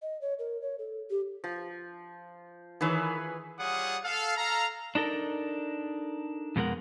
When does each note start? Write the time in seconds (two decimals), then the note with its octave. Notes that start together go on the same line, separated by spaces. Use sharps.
0.02 D#5
0.21 C#5
0.39 A#4
0.61 C#5
0.79 A4
1.10 G4
1.44 F3
2.81 D#3 E3 G#4 B4 C#5
3.59 G3 F4 G#4 C#5 F#5 D#6
4.04 A4 F5
4.37 A4 F5 A#5
4.95 D4 D#4 A4 A#4
6.56 F2 B2 G#3 A#4 F#5